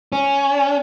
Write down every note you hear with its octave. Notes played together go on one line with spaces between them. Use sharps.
C#4